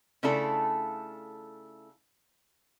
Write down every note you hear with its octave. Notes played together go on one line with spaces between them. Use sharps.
C#3 A3 D4 E4 F4 A4